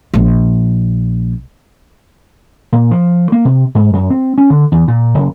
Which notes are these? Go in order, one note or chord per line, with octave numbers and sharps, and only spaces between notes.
A#1 A#3
A#2
F3
A#3
C3
G#2
F#2
C4
C#4
D3
E2
A#2
F#1